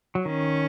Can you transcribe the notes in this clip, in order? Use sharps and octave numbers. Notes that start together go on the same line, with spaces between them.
F#3
D#3 C#4